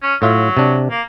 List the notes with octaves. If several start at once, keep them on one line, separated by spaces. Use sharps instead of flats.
C#4
A2 F#3 F4 E5
C3 D4
A#3